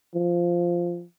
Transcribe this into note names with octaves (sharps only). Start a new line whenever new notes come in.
F3